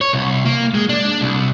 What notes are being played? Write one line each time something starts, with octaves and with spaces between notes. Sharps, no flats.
C#5
C2
A#3
G#3
D4
C2